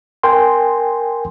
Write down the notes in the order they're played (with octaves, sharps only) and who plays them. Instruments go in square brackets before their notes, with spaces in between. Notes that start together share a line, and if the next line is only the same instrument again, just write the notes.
[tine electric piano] A#4 G5 G#5 C6